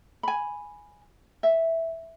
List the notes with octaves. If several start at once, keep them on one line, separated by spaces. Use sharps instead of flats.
G#5 B5
E5